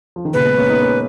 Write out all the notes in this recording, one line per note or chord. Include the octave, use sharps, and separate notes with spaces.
F3
D#3
A#2 C#3 B4
G#3 B3
A#3 C#4
B3 D#4
A#3 C#4